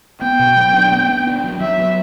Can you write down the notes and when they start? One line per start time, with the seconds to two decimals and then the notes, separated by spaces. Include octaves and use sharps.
0.22 B3 G5
0.39 B2
0.57 F#3
0.73 D4
0.92 B3
1.09 B3
1.27 D4
1.44 F#3
1.60 F#3 E5
1.79 B3